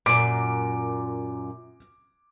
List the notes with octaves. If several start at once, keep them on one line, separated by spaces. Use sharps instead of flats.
F#2 A#2 D6 D7